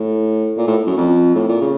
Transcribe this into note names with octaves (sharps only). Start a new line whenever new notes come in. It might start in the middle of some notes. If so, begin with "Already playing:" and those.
Already playing: A2
A#2
A2
F#2
F2
A2
A#2
C#3